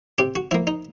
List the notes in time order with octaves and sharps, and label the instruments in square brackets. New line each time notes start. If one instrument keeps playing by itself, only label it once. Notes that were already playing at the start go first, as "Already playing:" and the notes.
[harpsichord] C3 G4
F#4
F3 A#3 E4
D#4